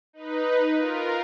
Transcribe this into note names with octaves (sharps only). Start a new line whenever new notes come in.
D#4 B4
F4 A#4